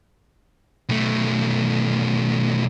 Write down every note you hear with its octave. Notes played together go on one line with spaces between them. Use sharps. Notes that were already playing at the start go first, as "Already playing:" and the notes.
B1 A3